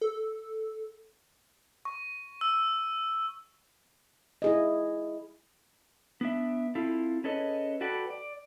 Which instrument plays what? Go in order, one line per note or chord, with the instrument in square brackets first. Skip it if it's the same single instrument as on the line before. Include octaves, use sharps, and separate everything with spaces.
[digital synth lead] A4
[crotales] C#6
E6
[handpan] E4 G#4 D#5
[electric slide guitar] B3 D4 E5
C4 E4 F4 A4
C#4 G#4 A4 B4 C#5 D#5
F#4 A4 B4 D5 F#5 G5
D5